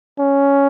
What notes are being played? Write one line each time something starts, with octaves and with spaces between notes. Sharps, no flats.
C#4